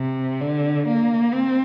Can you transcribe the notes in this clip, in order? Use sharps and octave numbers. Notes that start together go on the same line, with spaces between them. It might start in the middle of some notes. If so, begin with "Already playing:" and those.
Already playing: C3
D3
A#3
C4